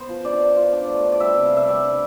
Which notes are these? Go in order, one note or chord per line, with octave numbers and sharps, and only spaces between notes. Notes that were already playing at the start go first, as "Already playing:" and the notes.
Already playing: B3 C5
F3
D4 D5
D4
F4
D4
A3
D4
D5
G3 E5
C3
F5
C3
E5
G3 D5
D4